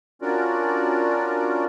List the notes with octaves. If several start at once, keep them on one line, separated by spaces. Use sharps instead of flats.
C#4 D4 F4 F#4 A#4 D5